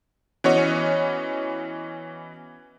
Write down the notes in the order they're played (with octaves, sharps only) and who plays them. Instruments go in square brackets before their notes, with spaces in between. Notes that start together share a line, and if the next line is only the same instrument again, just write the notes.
[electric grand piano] E3 B3 C#4 F#4 C#5 D#5